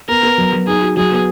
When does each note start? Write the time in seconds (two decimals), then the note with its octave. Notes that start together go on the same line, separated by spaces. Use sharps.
0.08 B3 A#4
0.23 B3
0.38 F#3
0.53 F#3
0.67 D#4 G#4
0.82 F#4
0.97 F#3 G#4
1.11 B3